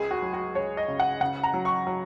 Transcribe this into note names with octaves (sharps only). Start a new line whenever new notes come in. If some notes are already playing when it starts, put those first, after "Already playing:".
Already playing: C#2 G#4
F#4
F#3
F#4
C#2 C#5
D#5
C#3
F#5
C#3 F#5
A#5
F#3
C#6
F#3